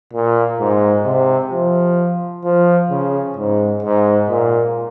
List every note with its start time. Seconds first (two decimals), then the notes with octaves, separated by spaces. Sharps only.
0.13 A#2
0.60 G#2
1.05 C3
1.52 F3
2.44 F3
2.90 C#3
3.37 G#2
3.83 G#2
4.29 A#2